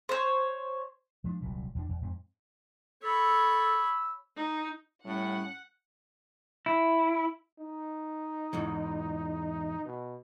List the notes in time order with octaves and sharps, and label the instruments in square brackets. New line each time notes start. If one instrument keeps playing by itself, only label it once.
[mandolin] C5 C#5
[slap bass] F3 G#3 B3 D4
D#1 C2 A#2 F#3
E2 D4
E2
F2 G#2 G3 C4
[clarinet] A4 [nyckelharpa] C#5 B5 [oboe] E6
[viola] D#4
[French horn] A2 [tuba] G3 [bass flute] C#4 [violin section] F#5
[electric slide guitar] E4
[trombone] D#4
[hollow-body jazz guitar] E2 G#2 E3
[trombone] B2